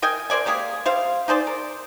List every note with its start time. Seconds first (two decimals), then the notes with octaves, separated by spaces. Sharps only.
0.02 A#4 D#5 G5 G#5
0.30 A#4 C5 D5 G#5
0.46 G#3 A#3 G4 G#4
0.86 G3 C5 F5
1.28 D#4 G#4 C5 D5
1.47 A#4